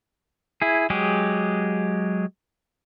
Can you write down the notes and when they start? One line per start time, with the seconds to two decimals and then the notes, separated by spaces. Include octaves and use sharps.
0.62 E4 G#4
0.90 F#3 G#3 G4 G#4